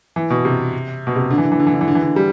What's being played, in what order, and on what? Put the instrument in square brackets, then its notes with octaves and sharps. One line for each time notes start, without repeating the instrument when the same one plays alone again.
[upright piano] E3
B2
C3
B2
C3
D3
E3
D3
E3
D3
E3
D3
E3
D3
E3
D3
G3